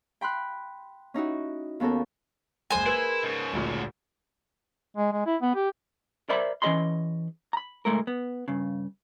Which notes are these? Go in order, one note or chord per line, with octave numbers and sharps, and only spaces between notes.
G5 B5 C6 F#6
C#4 D#4 E4 F#4
D#2 B3 C#4 A4 A#4
F#1 G#3 C5 G#5
E4 G4 G#4 A#4 B4
G#2 C#3
D#1 G#1 D2 A#2 C#4
G#3
G#3
E4
B3
G4
A#4 C5 D5 E5 B5
E3 C#4 G#4 D#5 B5 C6
A#5 B5
C#2 A2 D3 G#3 A3 A#4
B3
G2 C#3